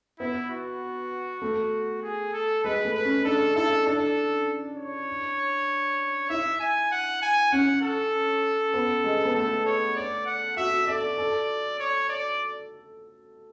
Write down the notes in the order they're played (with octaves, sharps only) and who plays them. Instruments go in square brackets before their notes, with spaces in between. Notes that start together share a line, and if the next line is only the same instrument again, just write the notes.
[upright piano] B3 [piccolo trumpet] E4
[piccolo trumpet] F#4
[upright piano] A3
[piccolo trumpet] G#4
A4
[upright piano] G#3 [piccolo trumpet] B4
[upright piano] A3
[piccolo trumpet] B4
[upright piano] C#4
[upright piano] D4 [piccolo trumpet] A4
[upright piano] E4 [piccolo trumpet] A4
[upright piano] D4 [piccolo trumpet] A4
[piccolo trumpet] C#5
[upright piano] E4 [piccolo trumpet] E5
[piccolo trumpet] G#5
F#5
G#5
[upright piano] C#4 [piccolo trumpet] F#5
[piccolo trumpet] A4
[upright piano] B3
G#3
B3
[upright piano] A3 [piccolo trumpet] A4
[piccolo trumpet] C#5
D5
F#5
[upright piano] F#4 [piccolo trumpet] E5
[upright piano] A4 [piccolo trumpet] D5
[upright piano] A4
[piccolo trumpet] C#5
D5